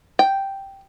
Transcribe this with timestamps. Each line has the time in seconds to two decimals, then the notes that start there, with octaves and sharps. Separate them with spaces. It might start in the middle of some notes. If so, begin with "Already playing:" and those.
0.19 G5